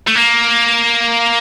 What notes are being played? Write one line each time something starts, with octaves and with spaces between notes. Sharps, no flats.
A3
A#3